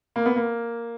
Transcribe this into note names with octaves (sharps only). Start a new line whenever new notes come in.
A#3
B3
A#3